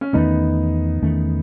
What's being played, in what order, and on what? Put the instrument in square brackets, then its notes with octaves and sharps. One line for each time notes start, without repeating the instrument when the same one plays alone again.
[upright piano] C#4
[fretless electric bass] E2 D#3 A3 C#4 [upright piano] B3 D#4
[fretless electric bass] E2 D#3 A3 C#4